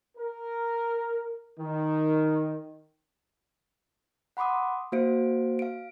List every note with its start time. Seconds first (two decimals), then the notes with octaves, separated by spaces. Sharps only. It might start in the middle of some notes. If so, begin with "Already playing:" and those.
0.17 A#4
1.59 D#3
4.37 F#5 B5 C6 D6 D#6
4.92 A#3 F#4 C5 F5 D7
5.59 F5 D7